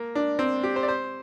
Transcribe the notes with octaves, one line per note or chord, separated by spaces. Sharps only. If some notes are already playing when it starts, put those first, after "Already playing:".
Already playing: A#3
D4
C4
G4
C5
D5
C5